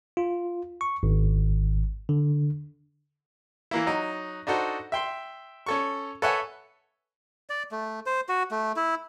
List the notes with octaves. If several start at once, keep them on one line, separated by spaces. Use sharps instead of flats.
F4
C#6
G#1
D3
E3 A#3 E4
F#3 D#4
D4 D#4 F#4 A4 C5
E5 G5 C6
C#4 A4 C#6
A4 B4 C#5 E5 F#5 G#5
D5
A3
C5
F#4
A3
E4